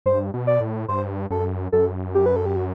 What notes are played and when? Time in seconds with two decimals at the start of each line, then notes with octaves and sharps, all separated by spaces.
0.06 G2 C5
0.34 B2
0.47 D5
0.60 A2
0.88 G2 C5
1.30 F#2 A4
1.72 F#2 A4
2.15 G4
2.26 B4
2.36 A4
2.46 G4
2.56 F#4